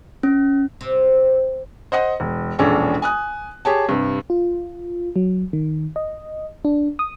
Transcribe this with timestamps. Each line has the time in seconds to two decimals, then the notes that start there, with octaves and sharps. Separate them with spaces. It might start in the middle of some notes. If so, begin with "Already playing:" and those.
0.23 C#4
0.81 C3
1.92 C5 D#5 F#5 D#6
2.20 E1
2.59 E1 A#1 C#4 D4 G#4 A4
3.02 G#5 D#6 F#6
3.65 G4 G#4 C#5 A5
3.89 G2 C3
4.30 F4
5.16 F#3
5.53 D#3
5.96 D#5
6.65 D4
6.99 D#6